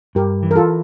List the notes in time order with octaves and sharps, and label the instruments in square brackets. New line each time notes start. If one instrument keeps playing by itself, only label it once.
[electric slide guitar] G2 [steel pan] G4 A#4
[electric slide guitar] E3
[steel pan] A#4
F4 A4